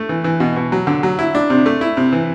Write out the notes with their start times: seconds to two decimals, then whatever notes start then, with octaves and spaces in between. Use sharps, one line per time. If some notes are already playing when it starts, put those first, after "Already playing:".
Already playing: A3
0.09 E3
0.24 E3
0.40 B2
0.56 B2
0.72 F#3
0.87 D3
1.03 F#3
1.19 E4
1.35 D4
1.50 C3
1.66 A3
1.81 E4
1.97 C3
2.13 E3